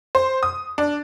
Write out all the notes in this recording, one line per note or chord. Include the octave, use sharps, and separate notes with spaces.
C5
D#6
D4